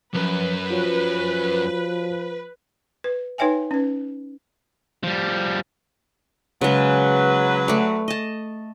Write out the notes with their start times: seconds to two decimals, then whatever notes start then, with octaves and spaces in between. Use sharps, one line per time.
0.14 C#2 F#2 F3 B4
0.70 F3 F4 F#4 C#5
3.04 B4
3.38 D#4 B4 C#5 E5 G5 G#5
3.71 C#4 B4
5.03 F3 G3
6.61 C#3 F#3 G#3 B4
7.68 A3 D5
8.08 D#5 A5